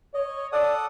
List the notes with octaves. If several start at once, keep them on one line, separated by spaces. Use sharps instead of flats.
C#5 D#5
A4 D5 F#5 D#6